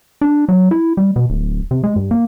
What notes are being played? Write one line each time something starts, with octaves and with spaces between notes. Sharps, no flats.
D4
F#3
E4
G3
B2
D1
C3
G#3
G2
A#3